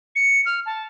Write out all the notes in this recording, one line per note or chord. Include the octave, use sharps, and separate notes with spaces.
C#7
F6
A5